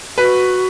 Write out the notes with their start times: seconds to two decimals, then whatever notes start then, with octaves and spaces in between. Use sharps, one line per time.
0.17 F#4 B4